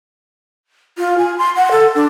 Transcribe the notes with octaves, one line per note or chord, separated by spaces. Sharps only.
F4
G#5
C6
F#5
A4
D4